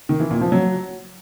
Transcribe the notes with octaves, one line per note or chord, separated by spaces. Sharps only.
D#3
E3
A#2
F3
F#3